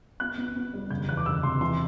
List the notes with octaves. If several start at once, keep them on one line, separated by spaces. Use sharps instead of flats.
B3 F#6
B3
B3
G3
F#1 G6
E2 F#6
D6
F#1 E6
C3 C6
E3 C6